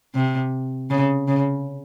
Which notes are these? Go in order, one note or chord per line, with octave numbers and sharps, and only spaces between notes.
C3
C#3
C#3